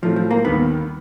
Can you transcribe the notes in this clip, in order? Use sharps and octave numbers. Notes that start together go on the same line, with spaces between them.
A2 F3 F#3 A3 C4
F3
A#3
D#2 D#3 G3 B3